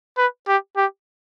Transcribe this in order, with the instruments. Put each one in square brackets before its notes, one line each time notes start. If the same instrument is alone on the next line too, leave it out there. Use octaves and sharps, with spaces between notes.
[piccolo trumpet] B4
G4
G4